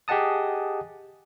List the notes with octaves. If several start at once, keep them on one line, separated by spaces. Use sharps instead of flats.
G4 G#4 D#5 F#5 A5 D#6